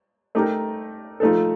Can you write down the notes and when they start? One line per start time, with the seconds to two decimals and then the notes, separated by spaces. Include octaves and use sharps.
0.35 A3 D#4 G4 A#4
1.20 F3 A3 D#4 A4